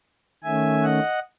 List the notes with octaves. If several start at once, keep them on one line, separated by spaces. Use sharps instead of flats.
D#3 A3 C#4 E5 G#5
D#5 F#5